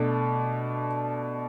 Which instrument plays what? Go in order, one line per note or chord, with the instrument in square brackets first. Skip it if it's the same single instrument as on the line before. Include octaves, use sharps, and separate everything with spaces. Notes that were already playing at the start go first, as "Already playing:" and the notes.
Already playing: [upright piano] B2 A3 D4